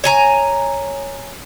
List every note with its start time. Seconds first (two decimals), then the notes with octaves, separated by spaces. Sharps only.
0.04 C#5 G#5 A#5